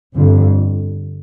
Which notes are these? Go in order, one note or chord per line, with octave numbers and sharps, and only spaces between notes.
G1 F2 D3